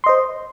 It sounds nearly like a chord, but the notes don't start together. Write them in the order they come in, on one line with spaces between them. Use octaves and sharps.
C6 D#5 C5